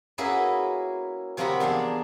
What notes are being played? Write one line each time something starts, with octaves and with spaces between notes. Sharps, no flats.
A#3 C#4 E4 F#4 G#4 B4
C3 F3 A#3 F#5 A#5 B5
E2 D4 G#4 F5